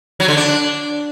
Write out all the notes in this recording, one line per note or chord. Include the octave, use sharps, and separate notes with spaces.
F#3
D3
D4